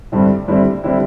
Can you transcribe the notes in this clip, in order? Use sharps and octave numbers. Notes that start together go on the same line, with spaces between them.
G2 D3 G3 C4 E4
G2 D3 G3 C4 E4
D3 G3 C4 E4